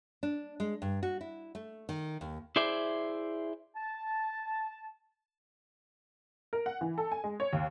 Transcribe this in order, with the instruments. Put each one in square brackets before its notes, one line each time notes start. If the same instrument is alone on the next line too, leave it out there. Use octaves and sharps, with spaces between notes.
[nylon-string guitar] D4
G#3
G2
F#4
E4
A3
D#3
D#2
[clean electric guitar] E4 G#4 C5 D5 E5
[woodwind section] A5
[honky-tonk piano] A#4
F#5
E3
A4
G#5
G#3
C#5
D#2